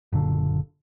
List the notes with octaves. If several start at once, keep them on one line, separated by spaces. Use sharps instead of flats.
F#1 A#2 D3